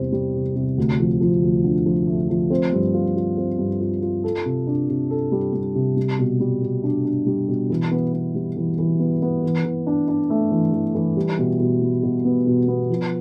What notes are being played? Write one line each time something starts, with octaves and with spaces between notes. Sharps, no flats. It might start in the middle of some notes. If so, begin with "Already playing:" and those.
Already playing: E2 C3 G3 C4
G3
C3
C3
D2
F3
F3
D2
D3
F3
A3
F3
C4
G2
F4
F4
C4
G2
F4
F4
A4
C3
D4
C3
A4
G3
G3
C3
G3
B2
G3
B2
D4
D4
G3
B2
E3
B3
B3
G3
E3
E3
B3
B3
E3
E3
D4
D4
A3
E3
E3
E3
G3
B2
B2
G3
B2
B3
B2
B3
F3